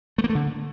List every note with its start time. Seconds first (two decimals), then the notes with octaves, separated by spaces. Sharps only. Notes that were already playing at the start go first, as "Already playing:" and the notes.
0.18 A3
0.24 A#3
0.30 A3
0.35 D3